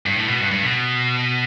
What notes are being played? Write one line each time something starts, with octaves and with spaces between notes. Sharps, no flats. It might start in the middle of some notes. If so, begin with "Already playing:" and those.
G2
A2
B2
G2
G2
B2